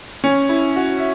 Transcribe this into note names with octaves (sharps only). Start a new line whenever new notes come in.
C#4
E4
F#4
E5